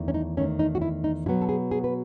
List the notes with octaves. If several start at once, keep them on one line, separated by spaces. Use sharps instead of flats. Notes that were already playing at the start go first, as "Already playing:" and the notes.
Already playing: E2 D#3 A3
C#4
D#4
E2 D#3 A3 C#4
D#4
F#4
E4
D#4
B2 F#3 B3 E4
A4
G#4
G#4
B4